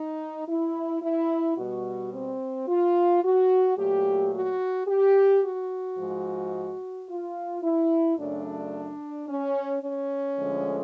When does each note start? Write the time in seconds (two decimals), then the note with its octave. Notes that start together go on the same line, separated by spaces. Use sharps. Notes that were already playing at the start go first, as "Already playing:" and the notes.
Already playing: D#4
0.48 E4
1.01 E4
1.57 B2 G3 F#4
2.13 C4
2.68 F4
3.23 F#4
3.77 A#2 F#3 A3 G4
4.33 F#4
4.87 G4
5.43 F#4
5.98 G#2 F3 G#3
7.08 F4
7.63 E4
8.17 F#2 C#3 F#3 A3 D4
9.28 C#4
9.83 C#4
10.38 D2 D3 F3 G#3